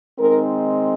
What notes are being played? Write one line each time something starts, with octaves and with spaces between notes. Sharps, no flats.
D#3 G#3 C4 D#4 A#4